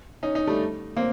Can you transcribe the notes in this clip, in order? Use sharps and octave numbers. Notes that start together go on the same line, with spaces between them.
C#4 D#4
C#4 D#4
G3 A3
A#3 C4